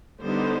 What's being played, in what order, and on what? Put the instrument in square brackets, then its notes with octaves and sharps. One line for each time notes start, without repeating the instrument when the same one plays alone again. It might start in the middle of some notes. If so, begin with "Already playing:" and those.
[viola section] D3 G3 B3 D#4 C5